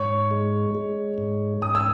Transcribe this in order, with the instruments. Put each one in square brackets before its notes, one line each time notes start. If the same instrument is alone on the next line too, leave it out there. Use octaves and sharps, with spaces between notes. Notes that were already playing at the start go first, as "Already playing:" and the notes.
Already playing: [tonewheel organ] G#2 [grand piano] C#5 C#6
[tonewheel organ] G#3
G#3
G#2
[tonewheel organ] G#2 [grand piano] D#6
[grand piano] E6